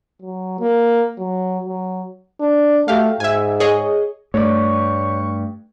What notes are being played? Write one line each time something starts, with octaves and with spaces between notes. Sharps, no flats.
F#3
A#3
F#3
F#3
D4
A3 F#4 G4 F5
G#2 E5 G#5
G#4 C#5 D#5
G2 A3 C#5 D5 C#6